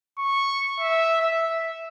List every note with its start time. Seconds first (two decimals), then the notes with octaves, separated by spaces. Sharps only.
0.19 C#6
0.81 E5
1.22 E5